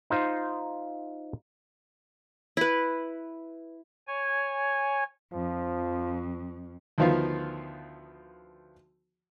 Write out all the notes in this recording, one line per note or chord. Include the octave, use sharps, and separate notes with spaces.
D#4 F4 C5 F5
E4 B4
C#5 G#5
F2 F3
D2 D#3 F3 B3 F4